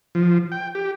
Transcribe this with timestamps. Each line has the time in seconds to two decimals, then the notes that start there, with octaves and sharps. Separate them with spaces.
0.15 F3
0.52 G5
0.75 G4